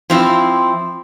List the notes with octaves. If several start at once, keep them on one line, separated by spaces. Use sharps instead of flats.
F3 C4 E4